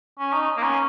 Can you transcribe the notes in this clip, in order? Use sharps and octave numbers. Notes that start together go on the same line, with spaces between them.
C#4
D#4
A#3
C#4